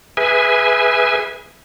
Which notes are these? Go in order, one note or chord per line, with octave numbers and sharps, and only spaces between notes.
G#4 B4 E5 G#5